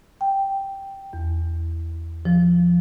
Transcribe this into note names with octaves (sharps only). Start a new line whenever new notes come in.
G5
E2
F3